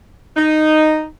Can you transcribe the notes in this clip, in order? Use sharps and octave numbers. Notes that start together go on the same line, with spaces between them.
D#4